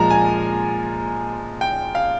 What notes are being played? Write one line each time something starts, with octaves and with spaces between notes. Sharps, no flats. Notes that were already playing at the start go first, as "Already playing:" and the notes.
Already playing: A#2 F3 G#3 A#5
G#5
G5
F5